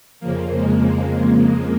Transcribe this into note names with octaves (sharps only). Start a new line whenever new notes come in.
F2 C#3 F3 A#3
G#3
A#3